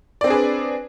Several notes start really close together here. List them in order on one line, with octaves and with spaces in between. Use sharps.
D5 C4 D4 G#4 B4